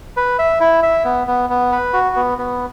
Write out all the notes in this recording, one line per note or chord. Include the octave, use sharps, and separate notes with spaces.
B4
E5
E4
E5
B3
B3
B3
B4
F#4
B3
B3